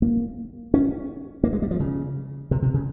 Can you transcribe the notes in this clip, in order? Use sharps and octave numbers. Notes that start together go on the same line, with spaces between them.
A#3
C#4
A#3
G#3
G3
F3
C#3
C3
C3
C#3